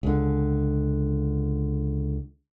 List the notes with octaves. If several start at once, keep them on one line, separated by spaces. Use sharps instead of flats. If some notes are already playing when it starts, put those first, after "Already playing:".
C#2 D3